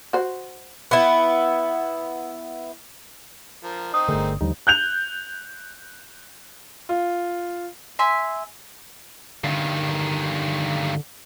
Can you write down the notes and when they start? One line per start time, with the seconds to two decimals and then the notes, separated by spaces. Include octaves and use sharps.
0.13 F#4 C5
0.91 B3 E4
3.64 F3 A#4
3.94 C4 D#4 C5 D#6
4.08 G1 D3 A3 G#4 A#4
4.41 D#2 D3 F3 G3 D#4
4.67 F#6 G6 F7
6.89 F4
7.99 E5 G#5 C6 E6
9.44 G2 D3 D#3